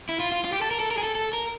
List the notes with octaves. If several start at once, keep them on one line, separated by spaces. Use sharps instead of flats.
E4
F4
F4
F4
G4
A4
A#4
A4
A#4
G#4
A4
A4
A#4